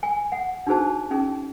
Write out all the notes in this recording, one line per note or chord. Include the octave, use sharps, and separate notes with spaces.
G#5
F#5
D4 D#4 F#4 G#4 C5 A5
C#4 D#4 G#4